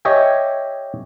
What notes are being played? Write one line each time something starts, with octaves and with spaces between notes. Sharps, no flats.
G4 C#5 D#5 E5 G#5